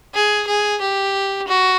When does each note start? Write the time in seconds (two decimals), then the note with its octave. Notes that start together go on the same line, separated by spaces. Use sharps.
0.14 G#4
0.47 G#4
0.81 G4
1.48 F#4